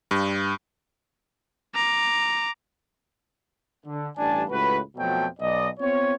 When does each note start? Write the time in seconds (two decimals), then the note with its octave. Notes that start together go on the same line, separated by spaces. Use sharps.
0.11 G2
1.75 A#5 D6
3.85 D3
4.17 A1 G2 D4 G#5 A5
4.50 C#2 A2 F#4 B4
4.97 F2 B2 F3 F#3 A3 G5
5.40 B1 D5 D#5
5.80 B3 C4 F4 C#5